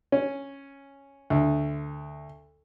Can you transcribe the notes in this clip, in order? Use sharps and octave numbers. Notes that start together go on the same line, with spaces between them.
C#4
D2